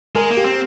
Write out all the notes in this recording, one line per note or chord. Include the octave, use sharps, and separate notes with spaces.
G#3 A#4
A#3
G4
C4